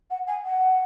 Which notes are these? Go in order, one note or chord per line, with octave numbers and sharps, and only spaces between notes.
F#5
G#5
F#5